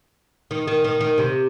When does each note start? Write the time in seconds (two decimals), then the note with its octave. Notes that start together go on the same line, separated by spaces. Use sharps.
0.51 D#3
0.67 D#3
0.84 D#3
1.01 D#3
1.18 C3